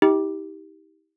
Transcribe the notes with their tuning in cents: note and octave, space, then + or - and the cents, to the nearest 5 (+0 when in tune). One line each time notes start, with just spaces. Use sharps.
D#4 +45 G4 +0